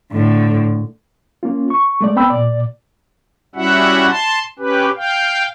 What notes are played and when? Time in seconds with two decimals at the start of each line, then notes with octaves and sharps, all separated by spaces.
0.12 A2 D3
1.43 A#3 C#4 F4
1.70 C#6
2.01 G#3 A3 D5
2.16 B3 C4 G5 B5 E6
2.30 A#2 D5
3.55 G3 C#4 E4 F#4 E5 F#5
4.09 A5 C6
4.59 C#4 G4 B4
4.96 F5 G5